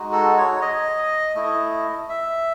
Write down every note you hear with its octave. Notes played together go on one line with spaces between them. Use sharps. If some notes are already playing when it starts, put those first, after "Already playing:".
Already playing: G#3 D#4 F#4
A4
C#5
D#5
A3 E4
E5